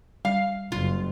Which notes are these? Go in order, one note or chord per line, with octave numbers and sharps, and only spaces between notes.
G3 F5
F#1 F4